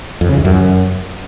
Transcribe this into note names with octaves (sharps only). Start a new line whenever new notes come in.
F2
C#3
E2
F#2